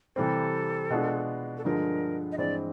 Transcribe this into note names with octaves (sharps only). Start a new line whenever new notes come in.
C3 E3 G3 C4 A4
B2 G#3 B3 D4 F4
A4
G2 D3 F3 G#3 A#4
D#5
G2 E3 G#3 C4 D5